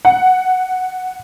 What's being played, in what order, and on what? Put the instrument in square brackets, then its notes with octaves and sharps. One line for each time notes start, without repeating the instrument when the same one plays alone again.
[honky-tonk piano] F#5